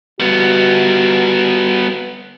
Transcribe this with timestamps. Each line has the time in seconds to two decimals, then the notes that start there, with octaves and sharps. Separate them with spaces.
0.20 G3 B3 F#4